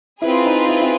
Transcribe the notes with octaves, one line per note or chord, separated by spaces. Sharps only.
C4 E4 F4 G#4 B4
D#4
E4
E4